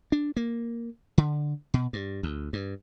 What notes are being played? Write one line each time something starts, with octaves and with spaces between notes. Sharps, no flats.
D4
A#3
D3
B2
G2
D2
G2